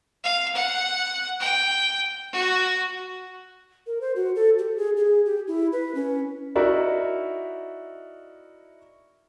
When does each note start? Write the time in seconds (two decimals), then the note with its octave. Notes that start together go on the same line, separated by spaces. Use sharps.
0.24 F5
0.55 F#5
1.40 G5
2.33 F#4
3.87 A#4
4.01 C5
4.16 F#4
4.36 A4
4.59 G4
4.77 G#4
4.97 G#4
5.26 G4
5.48 E4
5.73 B4
5.95 C#4
6.56 D#4 E4 F#4 A#4 D5 E5